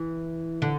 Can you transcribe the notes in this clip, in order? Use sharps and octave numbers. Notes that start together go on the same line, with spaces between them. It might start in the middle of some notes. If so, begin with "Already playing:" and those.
Already playing: E3
D3